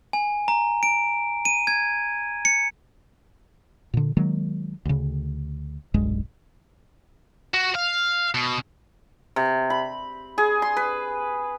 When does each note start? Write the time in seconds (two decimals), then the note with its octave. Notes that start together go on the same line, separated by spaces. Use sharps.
0.13 G#5
0.48 A#5
0.83 D7
1.45 D#7
1.67 G#6
2.45 C#7
3.94 A#2 D3
4.17 D#3 F#3 G#3 A#3
4.85 D2 C#3
5.94 D#1 B1 G2 G#3
7.54 F#4
7.75 F5
8.34 B2
9.36 C3
9.70 B5
10.38 G#4
10.62 C6
10.77 B4